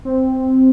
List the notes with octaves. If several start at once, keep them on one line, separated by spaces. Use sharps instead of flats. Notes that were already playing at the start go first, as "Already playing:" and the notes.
C4